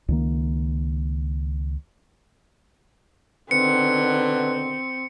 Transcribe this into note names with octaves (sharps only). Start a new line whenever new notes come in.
C#2 D#3 A#3
B2 D3 D#3 C4 B4 C#7